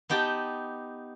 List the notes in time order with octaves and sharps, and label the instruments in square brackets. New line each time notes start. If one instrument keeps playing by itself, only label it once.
[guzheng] B3 D#4 G4 G5 A5